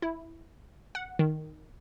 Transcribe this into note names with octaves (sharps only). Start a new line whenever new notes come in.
E4
F#5
D#3